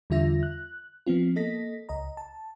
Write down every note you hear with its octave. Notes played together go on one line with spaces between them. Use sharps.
E2 D3 G3 F4 E5 A#6
F#6
F3 B3 C4 F4
A#3 A4 D#5 A#6 B6
C#2 D#5 A#5
A5